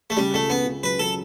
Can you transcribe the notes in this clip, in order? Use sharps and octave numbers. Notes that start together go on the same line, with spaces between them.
A3
C#3 G3
C#2 A3
C#2 B3
C#3
F#3 B4
F#3 A4